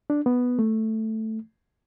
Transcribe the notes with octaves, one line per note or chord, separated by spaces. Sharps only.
D4
B3
A3